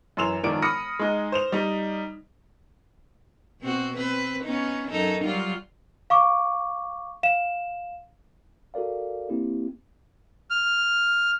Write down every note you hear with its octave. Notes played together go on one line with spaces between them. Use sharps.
F#2 E3 C6 E6 E7 F7
E1 D#3 F3 D5 D7
B5 D#6 F6 A#6 C#7
G#3 D#4
C5 E7 F7
G3 D#4
B2 C4 F#4
C4 B4
B3 C#4 D#4
F#2 D#4 A4
F#3 G3 F4
F5 C#6 D6
F5 E7
F#4 A4 A#4 D5 F5
A#3 C4 E4 G4
F6